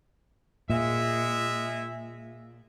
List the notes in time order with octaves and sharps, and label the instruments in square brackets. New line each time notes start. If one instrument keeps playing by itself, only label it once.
[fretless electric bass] A#2 [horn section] G#3 E5